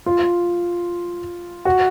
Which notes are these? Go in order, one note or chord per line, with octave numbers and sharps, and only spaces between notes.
F4
F#4